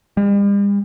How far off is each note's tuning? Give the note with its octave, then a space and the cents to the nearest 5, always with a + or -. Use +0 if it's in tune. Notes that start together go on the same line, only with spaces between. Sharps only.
G3 +45